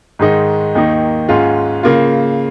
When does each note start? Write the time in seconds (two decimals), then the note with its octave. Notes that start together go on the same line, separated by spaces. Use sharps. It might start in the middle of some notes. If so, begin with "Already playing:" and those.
0.19 G#2 D#3 G#3 D#4
0.75 D#2 D#3 A#3 D#4
1.29 G#2 G#3 C#4 F4
1.83 C#3 A#3 F4